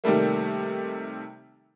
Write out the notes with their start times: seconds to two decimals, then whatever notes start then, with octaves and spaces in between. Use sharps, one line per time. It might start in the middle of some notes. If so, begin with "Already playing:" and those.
0.04 C3 D#3 G3 A3 A#3